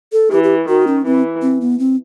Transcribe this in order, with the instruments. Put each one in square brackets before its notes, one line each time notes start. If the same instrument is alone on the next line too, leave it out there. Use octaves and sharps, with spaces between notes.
[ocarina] A4
[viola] E3 [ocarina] G4
[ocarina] G4
[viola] D#3 [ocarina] F#4
[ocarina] C#4
[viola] E3 [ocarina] C4
[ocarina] C4
B3
C4